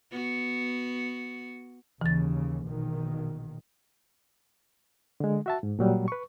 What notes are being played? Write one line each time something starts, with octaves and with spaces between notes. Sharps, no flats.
B3 F#4
D#2 C#3 E3 A6
A#1 B2 D#3
D3 G#3
F#4 E5 A5
G#2
A#2 F#3 G3
B4 C#6